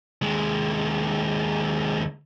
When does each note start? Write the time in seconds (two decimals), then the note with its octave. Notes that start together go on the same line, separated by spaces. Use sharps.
0.22 D#2 G#3